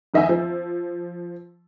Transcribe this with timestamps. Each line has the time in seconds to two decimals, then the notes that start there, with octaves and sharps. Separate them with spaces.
0.14 F2 D#3 D#5 E5 G#5 E6
0.29 F3